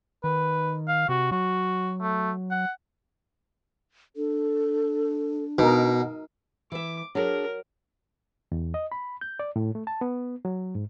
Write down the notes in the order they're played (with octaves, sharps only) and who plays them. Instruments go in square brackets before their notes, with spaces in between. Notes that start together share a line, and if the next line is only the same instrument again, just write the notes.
[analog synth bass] D#3 [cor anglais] B4
[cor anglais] F5
[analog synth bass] C3 [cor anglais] F#4
[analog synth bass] F#3 [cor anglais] F#4
[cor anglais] A3
F#5
[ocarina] D4 [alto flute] A4
[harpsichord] B2 [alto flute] B3 [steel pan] D#4 A#4
[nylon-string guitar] E3 E5 [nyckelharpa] D6
[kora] F#3 [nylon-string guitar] D4 G#4 [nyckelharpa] A#4
[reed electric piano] E2
D#5
B5
G6
D5
A2
A3
A5
B3
F#3
G#2